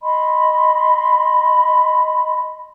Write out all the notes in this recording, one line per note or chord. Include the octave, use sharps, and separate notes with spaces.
D#5 B5 C6